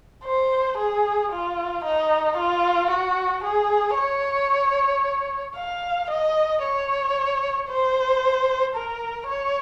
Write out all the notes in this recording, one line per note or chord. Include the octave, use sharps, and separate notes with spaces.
C5
G#4
F4
D#4
F4
F#4
G#4
C#5
F5
D#5
C#5
C5
A#4
C#5